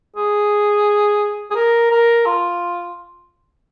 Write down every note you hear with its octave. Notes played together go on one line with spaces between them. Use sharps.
G#4
G#4
A#4
A#4
F4